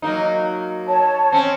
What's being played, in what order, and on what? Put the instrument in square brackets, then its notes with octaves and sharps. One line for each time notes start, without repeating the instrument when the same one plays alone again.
[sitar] F#3 A#3 D#4
[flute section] C#5 A5
[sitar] C4 C#4